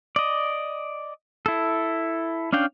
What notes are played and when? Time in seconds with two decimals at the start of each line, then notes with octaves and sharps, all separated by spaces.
0.16 D5 D#5
1.46 E4 A4
2.53 C#4 D4 F5 G5